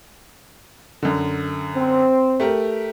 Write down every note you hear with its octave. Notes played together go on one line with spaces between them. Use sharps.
F#2 D3
C4
A3 G4 A#4